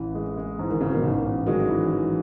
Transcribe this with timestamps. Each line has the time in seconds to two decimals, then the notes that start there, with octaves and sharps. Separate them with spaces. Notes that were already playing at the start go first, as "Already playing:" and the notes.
Already playing: A1 E3
0.15 G#3
0.38 G#3
0.59 G#2 E3
0.70 D#3
0.81 C#3 E3
0.91 B2 D#3
1.02 A1
1.25 A1
1.46 D#3 F#3 G#3
1.69 E3
1.91 E3